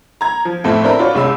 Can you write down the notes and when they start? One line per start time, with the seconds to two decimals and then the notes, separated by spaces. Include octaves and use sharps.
0.21 A#5 G#6
0.45 F3
0.64 F2 A2 A3 C4
0.84 C4 D4 E4 A#4 B5
0.99 F4 F#4 C#5 D5
1.15 C2 G#3 C#4 B5 E6